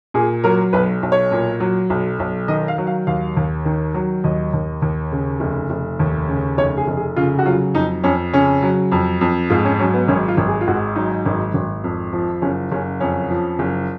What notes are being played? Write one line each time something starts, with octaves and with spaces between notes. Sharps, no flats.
A#2 G#4
F#3 A#4
B1 B4
B1
C#5
A#2
F#3
B1
B1
D#3 D#5
F5
F#3
F5
D#2 F5
D#2
D#3
F#3
D#2 D#5
D#2
D#2
C#3
F1
F1
D#2
C#3
F1 C#5
G#4
F1
G#4
C#3 F4
F#4
F#3 F4
F2 D#4
F2 C#4
C#3 C#4
F#3
F2
F2
G#2 F4
C#4
F#3 C#4
B3
G#1 C#4
F4
G#1
G#4
F4
G#2 F#4
F#3 D#4
G#1
G#1
F2
F3
F#1 C#4
F#1 C#4
F2 C#4
F3
F#1